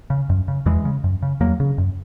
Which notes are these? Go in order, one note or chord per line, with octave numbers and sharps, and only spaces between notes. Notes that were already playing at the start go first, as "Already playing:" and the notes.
C#3
F#2
C#3
E2 E3 G#3
C#3
F#2
C#3
E2 F#3 A#3
C#3
F#2